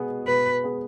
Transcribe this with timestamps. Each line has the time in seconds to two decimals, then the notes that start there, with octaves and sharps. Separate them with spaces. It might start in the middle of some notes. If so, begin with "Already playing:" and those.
Already playing: B2 B3 G#4
0.27 B2 B4
0.64 B3 G#4